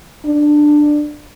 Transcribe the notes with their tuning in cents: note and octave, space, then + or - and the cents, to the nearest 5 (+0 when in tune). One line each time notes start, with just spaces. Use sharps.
D4 +15